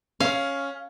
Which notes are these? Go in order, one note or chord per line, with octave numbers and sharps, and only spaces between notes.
C#4 F5